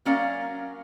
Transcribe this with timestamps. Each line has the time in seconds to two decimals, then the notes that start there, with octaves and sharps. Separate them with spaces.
0.05 F#3 A#3 C#4 A#4 D5 F5